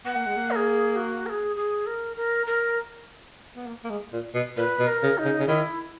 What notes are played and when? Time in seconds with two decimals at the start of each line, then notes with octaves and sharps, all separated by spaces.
0.05 B3 F#5
0.16 A#3
0.26 G#3
0.36 A#3
0.51 A#4
0.56 G#4
0.96 F#4
1.26 A#4
1.29 G#4
1.56 G#4
1.86 A#4
2.17 A#4
2.47 A#4
3.56 B3
3.67 A#3
3.84 A#3
3.90 G#3
4.12 A#2
4.34 B2
4.57 A#2 B4
4.79 B2
4.87 A#4
5.03 C#3
5.18 D#4
5.25 C#3
5.39 C#3
5.47 D#3 E4